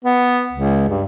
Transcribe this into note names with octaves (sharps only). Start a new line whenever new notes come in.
B3
C#2
G2